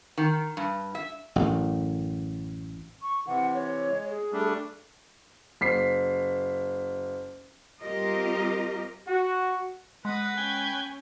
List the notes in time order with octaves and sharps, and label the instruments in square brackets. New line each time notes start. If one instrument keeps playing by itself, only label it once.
[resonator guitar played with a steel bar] D#3
G2
E5
[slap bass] A1 F#2 A2
[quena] C#6
[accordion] C3 E3 [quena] F#5
[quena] C#5
[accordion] G#3
[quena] G#4
[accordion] G3 A3 D4
[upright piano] F#1 B6 C7
[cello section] G3 C4 F4 G4 A#4 D#5
[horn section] F#4
[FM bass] G#3 [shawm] B4 [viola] D#5 F#5
[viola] C#4 [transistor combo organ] G5 G#5